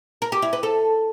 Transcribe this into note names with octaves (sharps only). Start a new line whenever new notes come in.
A#4
G4
E4
B4
A4